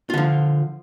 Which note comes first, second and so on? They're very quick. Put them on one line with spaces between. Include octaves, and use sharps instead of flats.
F4 D3 F3